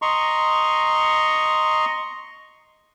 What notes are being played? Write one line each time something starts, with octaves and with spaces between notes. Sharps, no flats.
D#5 A#5 C6 C#6